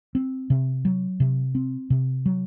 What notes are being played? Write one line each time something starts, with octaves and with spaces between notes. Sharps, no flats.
C4
C3
F#3
C3
C4
C3
F#3